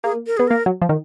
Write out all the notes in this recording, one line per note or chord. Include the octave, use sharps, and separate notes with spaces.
A#3 G#4
A#4
B3 G#4
A#3 A#4
F#3
F3
D#3